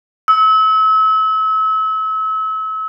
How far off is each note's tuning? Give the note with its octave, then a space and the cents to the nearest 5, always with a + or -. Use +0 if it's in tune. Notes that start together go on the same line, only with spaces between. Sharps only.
E6 -35